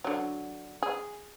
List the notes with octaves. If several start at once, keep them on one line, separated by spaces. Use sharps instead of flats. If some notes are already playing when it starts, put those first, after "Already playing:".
D3 F#3
G#4